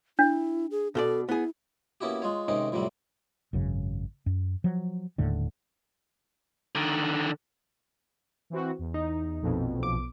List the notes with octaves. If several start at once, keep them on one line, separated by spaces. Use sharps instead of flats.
D4 E4
G#4
B2 A4 C5 D5
B3 E4 G#4
A#3 B3 C#4 E4 F#4 G4
G#3 F4 C#5
G#2 C3 D#3 C#4 D#4
F2 A2 C3 F#3 G3
G#1 F#2 C#3
F#2
F3 F#3
D#1 D#2 A2 D3
D3 D#3
E3 C4 F#4
E2
D#4
A#1 F2 B2
B1 D6